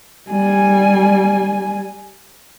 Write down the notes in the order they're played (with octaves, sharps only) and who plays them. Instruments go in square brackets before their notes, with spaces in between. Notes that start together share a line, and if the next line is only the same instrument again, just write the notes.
[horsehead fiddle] G3 G#5